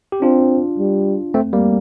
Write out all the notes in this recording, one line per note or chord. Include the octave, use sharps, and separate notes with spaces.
G4
C4 D4 F4
G3
A3 C4
G3 A#3